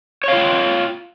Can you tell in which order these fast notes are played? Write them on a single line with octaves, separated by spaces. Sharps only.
C#5 F5 F4 G5